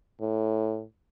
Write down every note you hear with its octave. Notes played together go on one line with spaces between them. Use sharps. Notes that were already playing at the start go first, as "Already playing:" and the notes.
A2